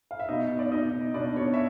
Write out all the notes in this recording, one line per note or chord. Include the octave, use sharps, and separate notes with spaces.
F5
E5
B2 D#4 D#5
B2
D5
B2 D#4 D#5
B2
B2 D4 D5
B2 C#5
E5